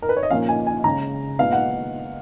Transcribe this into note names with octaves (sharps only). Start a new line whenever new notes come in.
A#4
B4
C#5
D#5
A#2 F3 A#3 C#4 F5
G#5
G#5
C#3 G#3 C#4 A#5
A#2 G#3 B3 F5
F#5